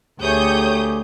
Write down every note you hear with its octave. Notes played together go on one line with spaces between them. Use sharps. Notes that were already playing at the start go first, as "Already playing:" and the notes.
D2 A3 G4 G#4 C#5 D#6 G6